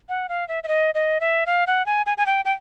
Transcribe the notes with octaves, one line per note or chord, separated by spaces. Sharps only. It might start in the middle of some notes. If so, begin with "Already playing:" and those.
F#5
F5
E5
E5
D#5
D#5
E5
F5
F#5
G#5
G#5
G#5
G5
G5